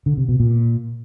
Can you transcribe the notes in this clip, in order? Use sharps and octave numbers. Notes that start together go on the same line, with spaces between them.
D3
C3
B2
A#2